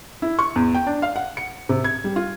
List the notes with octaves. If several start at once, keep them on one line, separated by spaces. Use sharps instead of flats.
E4
C#6
E2
G5
D4
F5
F#5
C#7
C3
G#6
G3
F4